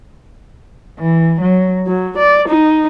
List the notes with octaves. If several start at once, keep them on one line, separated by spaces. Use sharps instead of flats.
E3
F#3
F#3
D5
D#4